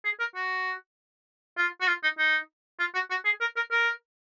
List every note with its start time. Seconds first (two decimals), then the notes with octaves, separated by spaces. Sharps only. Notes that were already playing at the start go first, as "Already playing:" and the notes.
0.05 G#4
0.20 A#4
0.35 F#4
1.57 F4
1.81 F#4
1.87 F4
2.03 D#4
2.18 D#4
2.79 F4
2.94 F#4
3.10 F#4
3.25 G#4
3.40 A#4
3.56 A#4
3.71 A#4